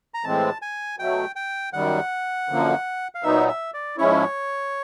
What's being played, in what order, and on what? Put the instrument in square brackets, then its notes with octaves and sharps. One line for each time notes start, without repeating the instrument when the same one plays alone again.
[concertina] A#5
[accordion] A2 E3 G#3 C4 [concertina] A5
[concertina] G#5
[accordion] B2 F#3 A3 [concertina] G5
[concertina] G5
[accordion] F#2 D#3 G3 [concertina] F#5
[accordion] F#2 D3 F3 A#3
[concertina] F5
[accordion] A#2 F#3 B3 D#4 [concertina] E5
[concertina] E5
D5
[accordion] G#2 F3 G#3 C#4 E4 [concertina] C#5